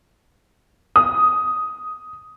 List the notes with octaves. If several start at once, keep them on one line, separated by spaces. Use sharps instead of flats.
D#6